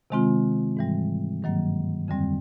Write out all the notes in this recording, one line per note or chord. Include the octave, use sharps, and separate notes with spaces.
C3 D#3 G#3 C4 F4
G#2 E3 G3
G2 D#3 F#3 A#3
F2 D3 G3 C4